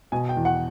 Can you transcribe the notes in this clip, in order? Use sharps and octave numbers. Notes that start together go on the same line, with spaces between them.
B2 G#5
G5
E2
F#5